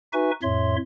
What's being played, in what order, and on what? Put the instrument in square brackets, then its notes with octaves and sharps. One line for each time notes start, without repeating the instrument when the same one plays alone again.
[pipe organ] D#4 F#4 B4 E5 G#5 C#6
F2 A2 C#5 E5 C6